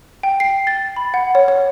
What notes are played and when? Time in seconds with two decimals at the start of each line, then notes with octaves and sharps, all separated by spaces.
0.23 G5
0.40 C7
0.67 A6
0.96 B5
1.14 F#5
1.35 C#5
1.48 C#5